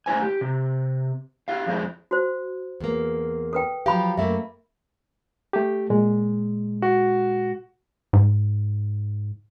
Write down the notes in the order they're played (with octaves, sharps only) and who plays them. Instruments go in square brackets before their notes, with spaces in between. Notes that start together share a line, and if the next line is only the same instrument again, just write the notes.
[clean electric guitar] A3 E4 C5 G#5
G4
C3
E4 G4 F5
F2 G#3 C4 C#4 D#4 E4
[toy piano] F#4 C5
[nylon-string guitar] E2 A#3
[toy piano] A4 B4 G5
[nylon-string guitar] F3 F#3 G4 [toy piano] F5 B5
[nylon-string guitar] F#2 A3 A#3 [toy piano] E5
[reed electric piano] A3 G4
A#2 G#3
[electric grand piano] F#4
[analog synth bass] G#2